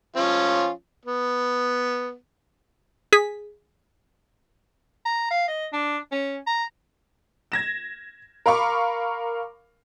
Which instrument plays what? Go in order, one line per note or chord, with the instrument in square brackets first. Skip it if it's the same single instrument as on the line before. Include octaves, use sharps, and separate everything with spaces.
[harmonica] F3 C#4 F4
B3
[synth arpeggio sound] G#4 B6
[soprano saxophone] A#5
F5
D#5
D4
C#4
A#5
[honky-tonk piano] G#6 A#6 E7
A#4 F5 B5 C#6 D6